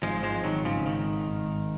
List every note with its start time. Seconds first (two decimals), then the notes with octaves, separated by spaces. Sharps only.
0.03 G#1 F3 G#3
0.23 F3 G#3
0.44 G#2 D#3 F#3
0.65 C#3 F3
0.86 G#2 D#3
1.27 G#2